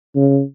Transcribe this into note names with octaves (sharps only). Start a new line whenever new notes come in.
C#3